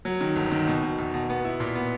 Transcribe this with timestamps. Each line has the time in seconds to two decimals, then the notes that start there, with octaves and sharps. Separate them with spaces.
0.05 F#3
0.21 D#3
0.36 G1
0.52 D#3
0.68 B2
0.83 B2
0.98 E2
1.14 B2
1.30 B3
1.45 E4
1.60 A#2
1.75 B3